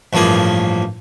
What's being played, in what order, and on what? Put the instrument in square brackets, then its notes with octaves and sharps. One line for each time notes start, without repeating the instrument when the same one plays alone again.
[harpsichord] A1 G2 F3 A#3 G#4